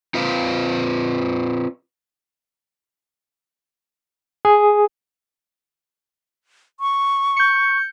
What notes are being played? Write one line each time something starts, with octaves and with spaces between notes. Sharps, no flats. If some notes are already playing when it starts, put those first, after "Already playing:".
C4 F4 B4 C5 F5
G#4
C#6
G6 C#7